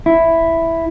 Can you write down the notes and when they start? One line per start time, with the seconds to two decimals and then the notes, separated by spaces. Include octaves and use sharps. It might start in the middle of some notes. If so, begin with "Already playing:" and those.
0.06 E4